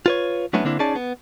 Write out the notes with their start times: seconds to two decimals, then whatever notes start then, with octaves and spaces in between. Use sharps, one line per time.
0.06 F4 B4 C#5
0.53 F#3 A3 B3 C#4 D4 E4
0.65 D3 A#3 C4 D4 E4
0.79 C#4 D#4 G#4 D5 A5
0.96 B3